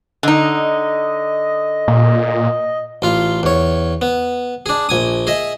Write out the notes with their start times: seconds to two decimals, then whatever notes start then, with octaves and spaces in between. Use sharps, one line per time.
0.23 D3 D#4 D#5
1.88 A#2
3.02 A1 F4 F5
3.43 E2 C#5
4.02 B3
4.66 D4 G#4
4.89 A#1 G#5 D#6
5.27 G#4 D#5 E5